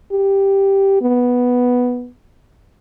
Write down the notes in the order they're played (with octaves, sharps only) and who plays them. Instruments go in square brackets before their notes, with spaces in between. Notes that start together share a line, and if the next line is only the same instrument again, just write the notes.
[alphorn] G4
B3